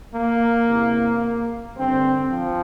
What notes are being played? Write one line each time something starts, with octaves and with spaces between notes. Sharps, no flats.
A#3
E2 C3 E3
G2 D3 C4
F3